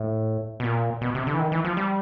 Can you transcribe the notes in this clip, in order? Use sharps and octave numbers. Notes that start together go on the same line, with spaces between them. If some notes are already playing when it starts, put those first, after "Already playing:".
Already playing: A2
B2
A#2
B2
C3
D3
E3
D#3
E3
F3
G3